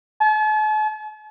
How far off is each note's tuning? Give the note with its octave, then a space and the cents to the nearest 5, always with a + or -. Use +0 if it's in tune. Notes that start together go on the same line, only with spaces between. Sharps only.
A5 -45